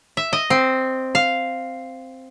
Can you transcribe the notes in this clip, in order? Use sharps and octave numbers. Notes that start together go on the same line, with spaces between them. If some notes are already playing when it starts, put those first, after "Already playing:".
E5
D#5
C4
F5